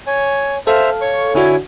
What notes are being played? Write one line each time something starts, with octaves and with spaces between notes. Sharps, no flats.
C#5 G#5
A4 C5 E5 F5 F6
C#5 C#6
D3 D4 E4 F#4 C#5 G#5